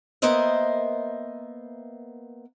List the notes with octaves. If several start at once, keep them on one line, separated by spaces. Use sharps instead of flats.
A#3 B3 A#4 C5 D#5 E5